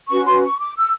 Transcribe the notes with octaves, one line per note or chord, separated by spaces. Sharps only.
C#4 F#4 B4 C#6
C6
C#6
D6
E6